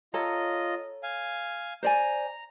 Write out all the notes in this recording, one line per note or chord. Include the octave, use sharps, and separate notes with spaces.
F4 A4 C#5 D#5 A#5
F5 G#5
C5 D5 G#5 A#5